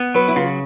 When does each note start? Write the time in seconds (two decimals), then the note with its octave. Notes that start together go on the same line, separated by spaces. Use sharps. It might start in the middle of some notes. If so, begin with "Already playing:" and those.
Already playing: B3
0.15 F#3 B4
0.28 E4
0.36 C#3 F4